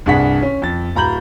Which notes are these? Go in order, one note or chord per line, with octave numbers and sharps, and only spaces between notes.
C2 G2 D4 G#4 F#5 B6
C#4
F2 A6
D1 A#5 B5 G6 F#7